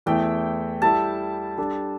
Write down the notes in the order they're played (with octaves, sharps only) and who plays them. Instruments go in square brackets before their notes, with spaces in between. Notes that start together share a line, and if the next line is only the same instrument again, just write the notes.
[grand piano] E2 E3 A3 E4 [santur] G5
[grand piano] G3 E4 A4 [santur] A5
[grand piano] G3 D4 A4